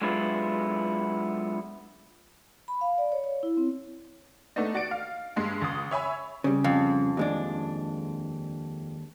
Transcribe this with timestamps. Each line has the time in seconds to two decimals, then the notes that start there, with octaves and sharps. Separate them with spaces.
0.01 F#3 G#3 B3 D4 E4 F4
2.68 B5
2.81 F5
2.98 D5
3.12 C#5
3.24 C#5
3.43 E4
3.57 C4
4.56 A3 B3 D4 D#4
4.74 F#4 D5 A6 C#7 D7
4.91 F5
5.36 G2 G#3 C6
5.62 C#2 D#6
5.91 C#5 E5 G#5 B5
6.44 C#3 G3
6.64 F2
7.17 D#2 G#3 D4